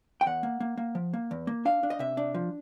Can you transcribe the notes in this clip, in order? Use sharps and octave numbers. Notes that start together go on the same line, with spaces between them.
G5
E2 F#5
A#3
A#3
A#3
F3
A#3
E2
A#3
D4 F5
D4
D#5
C3 E5
D4
F3